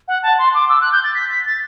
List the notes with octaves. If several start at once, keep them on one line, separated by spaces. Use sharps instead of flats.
F#5
A5
C6
D6
E6
F#6
G6
A6
B6
B6
A6